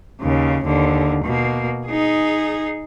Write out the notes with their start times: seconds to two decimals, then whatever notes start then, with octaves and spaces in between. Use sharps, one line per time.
0.21 D#2 C#3
0.65 D#2 D3
1.24 B2 A#3
1.87 D#4 G#4